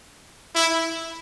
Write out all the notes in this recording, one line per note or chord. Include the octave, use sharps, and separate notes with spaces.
E4